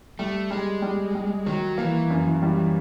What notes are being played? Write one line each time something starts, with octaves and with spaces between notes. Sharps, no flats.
G3 A3
G3 G#3
G3
G3
D#3 F#3
E3 A#3
F#2
G3